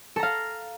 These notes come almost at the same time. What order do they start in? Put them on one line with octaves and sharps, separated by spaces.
A4 A#5 F5